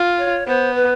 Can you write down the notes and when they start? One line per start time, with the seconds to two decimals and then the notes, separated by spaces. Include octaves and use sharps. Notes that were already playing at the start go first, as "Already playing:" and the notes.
Already playing: F4
0.18 C#5
0.47 B3 C5
0.75 B4